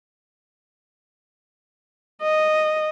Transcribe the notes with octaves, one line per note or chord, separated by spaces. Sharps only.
D#5